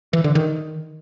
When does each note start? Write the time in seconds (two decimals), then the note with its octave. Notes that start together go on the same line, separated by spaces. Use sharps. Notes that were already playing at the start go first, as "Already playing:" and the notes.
0.13 E3
0.24 D3
0.35 D#3